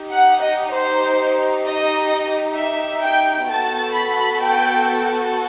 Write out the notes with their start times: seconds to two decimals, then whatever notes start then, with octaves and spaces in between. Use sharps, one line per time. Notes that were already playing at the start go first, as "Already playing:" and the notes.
Already playing: D#4 G4
0.11 F#5
0.41 D#5
0.72 C5
1.65 D#5
2.56 E5
3.02 G5
3.47 B3 F#4 A4 A5
3.94 B5
4.40 G5